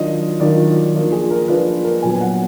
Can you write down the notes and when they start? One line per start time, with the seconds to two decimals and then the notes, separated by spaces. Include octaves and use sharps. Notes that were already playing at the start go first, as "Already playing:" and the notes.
Already playing: D#3 F#3 D4 F4 D#5
0.40 D#3 F#3 D4 F4 D5
0.94 F3 A#3 D4 F4 A#4
1.12 G#4
1.30 A#4
1.48 F3 A#3 D4 F4 B4
1.84 A#4
2.02 A#2 F#3 B3 G#5
2.15 G#5
2.21 F#5